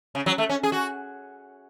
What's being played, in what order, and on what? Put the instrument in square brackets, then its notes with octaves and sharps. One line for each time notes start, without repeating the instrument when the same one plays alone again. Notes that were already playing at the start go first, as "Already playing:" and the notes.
[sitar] C#3
F#3
A3
C#4
G#4
F#4